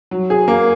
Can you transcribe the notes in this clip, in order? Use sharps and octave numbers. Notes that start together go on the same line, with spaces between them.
F#3
G#4
A#3